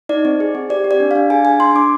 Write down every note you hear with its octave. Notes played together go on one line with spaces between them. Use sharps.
D#4 D5
C4
G#4
C4
G4 D5
G4
D5
D4
D4 F5
G#4 G#5
G#4 G#5
D4 C6
D4 D6